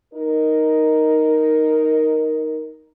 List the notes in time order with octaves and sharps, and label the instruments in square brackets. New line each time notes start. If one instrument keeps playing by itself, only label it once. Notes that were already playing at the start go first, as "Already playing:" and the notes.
[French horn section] D#4 A#4